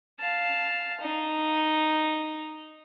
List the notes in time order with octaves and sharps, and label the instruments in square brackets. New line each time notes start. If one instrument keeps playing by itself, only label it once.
[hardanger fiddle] F5 A5
D#4